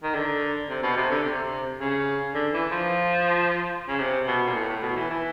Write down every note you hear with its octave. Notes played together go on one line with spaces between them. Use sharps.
D#3
D3
C3
B2
C3
D3
C3
C#3
D3
E3
F3
C#3
C3
B2
A#2
A2
A2
B2
E3
E3